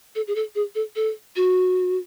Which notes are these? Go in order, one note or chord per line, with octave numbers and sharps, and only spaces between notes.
A4
G#4
A4
G#4
A4
A4
F#4